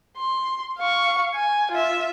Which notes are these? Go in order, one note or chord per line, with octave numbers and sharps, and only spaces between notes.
C6
F5 C#6
G#5
F4 E5